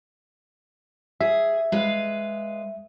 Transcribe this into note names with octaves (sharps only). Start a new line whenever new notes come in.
G#4 E5
G#3 B4 F5